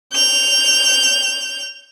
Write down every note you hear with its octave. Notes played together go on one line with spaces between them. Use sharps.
G6 F7